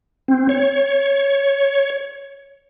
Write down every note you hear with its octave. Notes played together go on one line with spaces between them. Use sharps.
C4
C#5